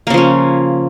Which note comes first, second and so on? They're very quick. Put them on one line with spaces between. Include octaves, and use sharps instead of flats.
A#3 C#3 F3 C#4